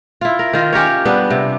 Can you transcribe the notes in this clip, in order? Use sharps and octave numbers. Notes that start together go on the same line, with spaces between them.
E4 F4
A#4
D#3 F4
C#4 G4 A#4 C#5
G3 B3 D4
C3